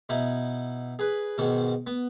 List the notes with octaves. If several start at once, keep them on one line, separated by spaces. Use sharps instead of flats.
B2 D#4 E4
G#4 B4
G#2 B2 D#3
B3